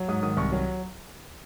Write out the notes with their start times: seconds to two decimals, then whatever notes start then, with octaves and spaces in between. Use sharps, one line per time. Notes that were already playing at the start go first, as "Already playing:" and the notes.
Already playing: F#3
0.08 G#2 D#6
0.23 D#3 D#6
0.37 C2 C#6
0.52 F#3